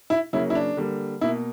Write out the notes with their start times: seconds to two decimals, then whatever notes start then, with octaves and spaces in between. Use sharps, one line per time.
0.10 E4
0.33 C#3 F#3 A#3 E4
0.50 E4
0.55 D4
0.77 D3 G3 A#3
1.21 B2 A#3 E4